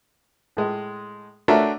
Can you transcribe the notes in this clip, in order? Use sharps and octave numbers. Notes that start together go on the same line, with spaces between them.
A2 G#3
A3 D4 F#4 A#4 C#5 E5